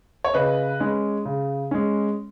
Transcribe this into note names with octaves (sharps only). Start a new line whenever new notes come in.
C#5
C#3 B4 D#5
G#3 C#4
C#3
G#3 C#4